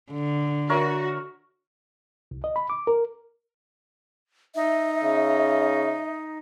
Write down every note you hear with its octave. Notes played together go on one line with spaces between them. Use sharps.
D3
F#4 A#4 C#5 E5
C2
D#5
B5
D6
A#4
D#4 E5
C#3